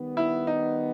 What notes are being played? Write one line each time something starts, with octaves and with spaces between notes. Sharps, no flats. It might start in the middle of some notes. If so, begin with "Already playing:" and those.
Already playing: D#3 G3 B3
E4
D#4